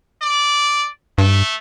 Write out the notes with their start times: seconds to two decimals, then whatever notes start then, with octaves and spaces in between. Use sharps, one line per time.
0.22 D5
1.18 G2 A3